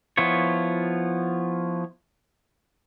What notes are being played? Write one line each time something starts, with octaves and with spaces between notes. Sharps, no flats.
F3 B3 E4 F4 C#5